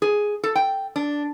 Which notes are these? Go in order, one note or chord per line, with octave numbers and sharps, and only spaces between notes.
G#4
A4
G5
D4